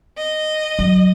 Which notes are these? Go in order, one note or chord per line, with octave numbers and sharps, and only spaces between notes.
D#5
F#3